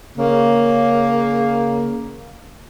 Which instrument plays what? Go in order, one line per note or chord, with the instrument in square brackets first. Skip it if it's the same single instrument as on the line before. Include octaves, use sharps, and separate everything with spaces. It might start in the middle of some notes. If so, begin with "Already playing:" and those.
[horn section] C#3 A#3